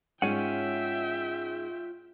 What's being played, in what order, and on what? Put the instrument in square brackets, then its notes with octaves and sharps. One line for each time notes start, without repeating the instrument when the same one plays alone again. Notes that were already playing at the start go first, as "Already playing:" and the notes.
[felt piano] G#2 [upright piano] C#4 D#7 [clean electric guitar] F4 C#5 F#5 [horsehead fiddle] E5 G5